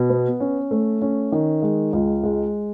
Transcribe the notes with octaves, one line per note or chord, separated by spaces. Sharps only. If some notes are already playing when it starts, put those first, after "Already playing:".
Already playing: B2
B3
C#4
A3
C#4
D#3
G#3
C#2
G#3